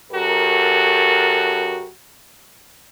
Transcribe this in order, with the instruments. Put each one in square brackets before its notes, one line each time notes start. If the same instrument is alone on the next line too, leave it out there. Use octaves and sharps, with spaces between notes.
[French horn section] F#2 F#4 G4 A4 A#4